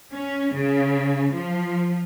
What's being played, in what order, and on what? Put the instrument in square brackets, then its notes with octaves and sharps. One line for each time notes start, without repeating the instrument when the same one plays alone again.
[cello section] C#4
C#3
F3